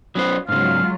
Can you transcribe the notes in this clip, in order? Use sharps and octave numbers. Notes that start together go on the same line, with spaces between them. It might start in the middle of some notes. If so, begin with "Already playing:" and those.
F#3 B3 C#4 C5
G#2 C#3 F#3 G#3 F4 F5